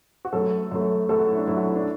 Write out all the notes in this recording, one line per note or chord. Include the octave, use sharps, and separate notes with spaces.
F#4
F#2 F#3 A3 A4
F#2 F#3 A3
F#2 F#3 A3 A4
F#4
E4
D4
F#2 F#3 A3 E4
F#4
E4
D4